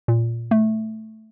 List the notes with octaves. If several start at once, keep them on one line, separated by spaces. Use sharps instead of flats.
A#2
A3